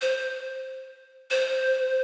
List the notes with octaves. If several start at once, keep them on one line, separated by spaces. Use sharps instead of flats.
C5
C5